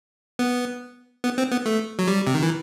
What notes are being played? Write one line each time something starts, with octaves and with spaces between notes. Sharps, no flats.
B3
B3
C4
B3
A3
F#3
G3
C3
D#3
E3